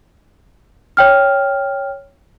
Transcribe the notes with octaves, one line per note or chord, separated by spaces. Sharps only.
C#5 G5 F6